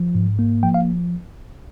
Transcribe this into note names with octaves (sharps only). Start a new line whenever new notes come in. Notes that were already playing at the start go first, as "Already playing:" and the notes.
Already playing: F3
G#2
A#3
F3 G5
F5